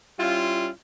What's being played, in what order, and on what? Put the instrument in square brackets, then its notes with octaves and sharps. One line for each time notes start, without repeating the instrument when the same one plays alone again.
[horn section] G3 C#4 E4 F4